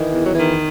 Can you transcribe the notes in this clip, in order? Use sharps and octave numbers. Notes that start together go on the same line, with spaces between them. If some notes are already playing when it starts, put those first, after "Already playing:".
Already playing: D#3 E3
E2
F#3
D#3 E3